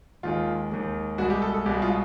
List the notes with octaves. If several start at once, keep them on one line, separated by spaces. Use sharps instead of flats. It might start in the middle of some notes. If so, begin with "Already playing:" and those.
D#2 D#3 G#3 F4
D#2 D#3 G#3
C2 B2 G#3 F#4
G4
A4
A4
C2 B2 G#3 G4
F4